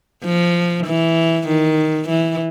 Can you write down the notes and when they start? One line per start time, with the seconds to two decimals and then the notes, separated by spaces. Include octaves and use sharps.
0.25 F3
0.87 E3
1.48 D#3
2.09 E3